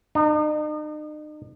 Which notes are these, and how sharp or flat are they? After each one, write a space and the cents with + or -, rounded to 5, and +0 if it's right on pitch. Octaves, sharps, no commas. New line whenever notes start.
D#4 -40